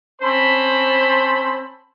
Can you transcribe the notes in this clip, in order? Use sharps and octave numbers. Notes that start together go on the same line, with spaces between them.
C4 C#4 C5 A5 B5